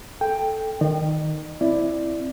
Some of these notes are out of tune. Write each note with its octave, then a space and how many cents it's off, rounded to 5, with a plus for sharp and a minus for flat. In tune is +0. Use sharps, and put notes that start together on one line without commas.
A4 -5 G5 +10
D#3 +0 D#5 -40
C4 +0 E4 +0 D5 +5